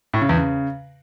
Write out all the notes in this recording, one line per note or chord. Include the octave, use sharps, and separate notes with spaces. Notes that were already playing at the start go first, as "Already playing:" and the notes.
A2
C#3
E2
C#3